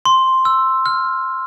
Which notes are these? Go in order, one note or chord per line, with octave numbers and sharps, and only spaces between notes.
C6
E6
F6